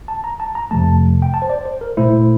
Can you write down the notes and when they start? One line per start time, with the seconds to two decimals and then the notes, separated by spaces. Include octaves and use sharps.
0.08 A5
0.24 A#5
0.40 A5
0.55 A#5
0.71 F2 C3 F3 A3 A5
1.22 G5
1.34 A5
1.42 C5
1.50 D5
1.65 C5
1.81 A#4
1.97 A#2 A3 E4 C5